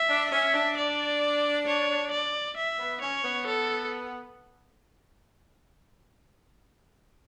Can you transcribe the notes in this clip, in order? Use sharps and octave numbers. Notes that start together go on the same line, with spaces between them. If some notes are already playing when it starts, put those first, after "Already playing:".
Already playing: E5
D4
C#4 E5
D4
D5
C#5
D5
E5
B3
C#4 C#5
B3
A4